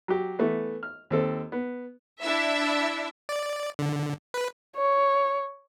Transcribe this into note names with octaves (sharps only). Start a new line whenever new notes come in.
F#3 G4
E3 A3 B3
F6
D#2 C4 A4
B3
D4 E4 E5
D5
D3
B4
C#5